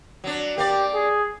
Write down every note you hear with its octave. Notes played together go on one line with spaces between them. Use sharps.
F#3 D4
A#3 G4 D5
G#4